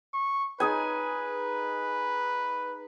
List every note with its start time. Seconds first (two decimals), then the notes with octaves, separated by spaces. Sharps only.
0.13 C#6
0.60 D#4 G#4 B4 G#5